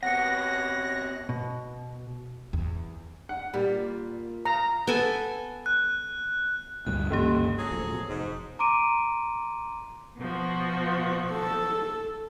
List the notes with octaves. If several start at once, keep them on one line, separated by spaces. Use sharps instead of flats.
C3 B3 C#5 F#5 F#6 A#6 C#7
B2
E2
F#5
A#2 G3
F5 A#5
B3 A4 G#5
F#6
D2 G2 B2 F#6
G1 C#2 C#3 E3 A#3 G4
F#3 G#4 A4
D1 D2 F3
B2 B3
F1 G#2
A#5 C6 D6 D7 D#7
B2 F3 F#4
A4